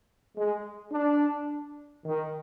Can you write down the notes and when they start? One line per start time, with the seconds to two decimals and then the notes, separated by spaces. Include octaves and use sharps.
0.36 G#3
0.91 D4
2.05 D#3